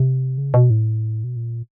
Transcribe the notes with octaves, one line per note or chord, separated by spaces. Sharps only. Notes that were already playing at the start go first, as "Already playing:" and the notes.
Already playing: C3
C#3
B2
A2
B2
A#2